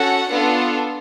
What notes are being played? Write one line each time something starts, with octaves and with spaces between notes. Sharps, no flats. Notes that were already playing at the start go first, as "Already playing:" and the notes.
Already playing: C#4 F#4 A4 F#5
B3 D4 F4 A4